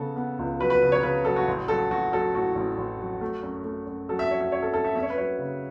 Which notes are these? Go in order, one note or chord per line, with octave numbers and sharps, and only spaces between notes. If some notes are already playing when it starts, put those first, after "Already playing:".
Already playing: C#3 B3 A4
B3
C#2
F#3 B4
B4
C#3
C#5
C#3 B4
F#3 A4
F#4
A1
F#3 A4
A1 F#4
F#3 A4
A2 F#4
A1
A1
F#3
A3
F#2
A3
F#2
F#3 A4
E5
F#3 C#5
E5
F#2 C#5
A4
F#2 A4
E5
C#4 E5
C#5
B4
F#3 C#5
C#3